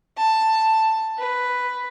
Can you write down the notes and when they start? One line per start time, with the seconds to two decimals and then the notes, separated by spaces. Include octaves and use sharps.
0.18 A5
1.17 B4